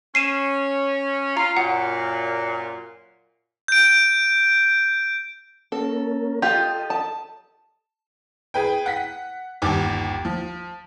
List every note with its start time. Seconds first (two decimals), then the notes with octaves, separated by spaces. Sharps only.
0.15 C#4 C7 D#7 E7
1.37 F4 A#5
1.57 F#2 A#2 F#5
3.68 G6 D7
5.72 A#3 C#4 A4 A#4
6.42 F4 G4 A4 D#5
6.90 A5
8.54 G#4 B4 G5
8.86 F#5 B6
9.62 G1 D#2 G4 D6
10.25 F3